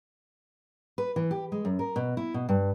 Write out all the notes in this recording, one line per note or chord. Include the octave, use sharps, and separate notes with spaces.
B4
E3
G4
G#3
F#2
A#4
B2
E4
B2
G2